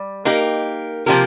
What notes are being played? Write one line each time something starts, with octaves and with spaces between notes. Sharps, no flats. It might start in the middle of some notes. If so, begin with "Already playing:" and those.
Already playing: G3
A#3 D#4 G4 A#4
C3 F3 A#3 G4 A#4